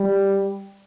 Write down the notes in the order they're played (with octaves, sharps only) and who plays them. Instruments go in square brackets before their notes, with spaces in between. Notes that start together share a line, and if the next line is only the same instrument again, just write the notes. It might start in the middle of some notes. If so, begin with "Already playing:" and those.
Already playing: [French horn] G3